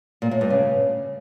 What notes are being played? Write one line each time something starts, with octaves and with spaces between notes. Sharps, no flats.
A#2
A2
G2
C#3